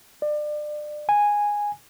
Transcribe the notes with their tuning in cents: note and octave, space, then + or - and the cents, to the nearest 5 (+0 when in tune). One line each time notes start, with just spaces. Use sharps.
D5 +30
G#5 -5